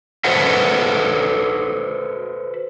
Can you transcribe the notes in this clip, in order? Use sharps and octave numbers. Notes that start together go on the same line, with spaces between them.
F#4 A4 B4 C5 E5 F#5